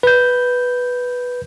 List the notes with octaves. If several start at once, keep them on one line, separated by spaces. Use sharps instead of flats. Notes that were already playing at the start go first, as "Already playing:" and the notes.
B4 G6